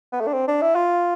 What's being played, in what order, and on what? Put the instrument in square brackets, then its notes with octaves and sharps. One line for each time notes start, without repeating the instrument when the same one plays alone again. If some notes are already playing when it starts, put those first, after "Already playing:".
[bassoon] B3
A3
D4
C4
D4
E4
F4